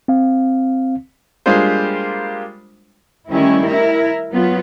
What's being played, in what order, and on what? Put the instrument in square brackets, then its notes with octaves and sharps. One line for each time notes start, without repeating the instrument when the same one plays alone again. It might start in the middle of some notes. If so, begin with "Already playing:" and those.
[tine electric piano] C4 F5
[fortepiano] G3 G#3 A#3 D4 F4 C5
[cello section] D#3 G3 A3 C#4 E4
E4 A#4
F#3 B3 F4